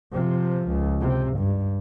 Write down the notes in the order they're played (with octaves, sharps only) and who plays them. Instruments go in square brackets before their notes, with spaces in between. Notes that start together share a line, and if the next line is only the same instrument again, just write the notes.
[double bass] C3 F3
C#2
C3
G2